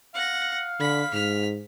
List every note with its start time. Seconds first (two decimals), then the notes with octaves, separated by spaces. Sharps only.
0.15 F5 F#5 A#6
0.80 D3 B5 B6
1.14 G#2 F6 B6